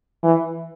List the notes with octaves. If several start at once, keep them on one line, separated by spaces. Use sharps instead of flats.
E3